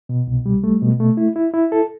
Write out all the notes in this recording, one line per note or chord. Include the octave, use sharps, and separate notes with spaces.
B2
C2
G3
A3
B2
A3
E4
E4
E4
A4